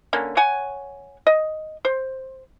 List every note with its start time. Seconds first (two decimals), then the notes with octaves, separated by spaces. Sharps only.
0.13 D3 A#3 C#4
0.37 C#5 F#5 G#5
1.27 D#5
1.85 C5